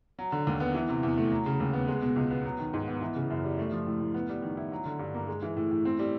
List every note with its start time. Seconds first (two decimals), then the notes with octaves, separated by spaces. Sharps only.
0.19 F#3
0.32 D3
0.47 D#2
0.60 B3
0.75 E3
0.89 C3
1.03 E2
1.18 A3
1.32 F#3
1.46 C#3
1.60 D#2
1.73 B3
1.88 G#3
2.02 B2
2.16 C#2
2.31 B3
2.44 F#3
2.59 D#3
2.74 G#2
2.88 B3
3.01 E3
3.16 C#3
3.30 F#2
3.44 G3
3.59 A3
3.72 F3
3.87 A2
4.00 A2
4.14 B3
4.29 G3
4.43 D#3
4.57 E4
4.72 F#3
4.86 D3
4.99 G2
5.14 A#3
5.28 G#3
5.42 E3
5.57 A2
5.71 A2
5.85 C4
5.99 G3